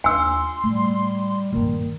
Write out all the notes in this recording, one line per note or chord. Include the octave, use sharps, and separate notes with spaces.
D#2 D4 F4 G#5 C6 E6
A2 G3
G2 A#2 D#3